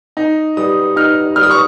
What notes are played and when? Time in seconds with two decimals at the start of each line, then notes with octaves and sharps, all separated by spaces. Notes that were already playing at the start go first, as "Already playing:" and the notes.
0.17 D#4
0.57 G3 D#6
0.96 D#4 F6
1.36 G3 F6
1.43 D#6
1.51 C#6